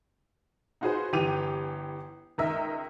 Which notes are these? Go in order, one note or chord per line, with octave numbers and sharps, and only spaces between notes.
D#4 F4 F#4 G#4 B4 C5
G1 E3 G4 D6 D#7 F7
C#2 D#3 A#4 D#5 E5 E6